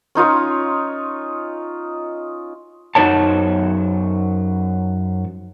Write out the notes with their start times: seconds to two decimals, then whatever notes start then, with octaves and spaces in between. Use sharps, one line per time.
0.15 C#4 D#4 F4 C#5
2.95 F#2 F#3 D#4 C5 C#5 A5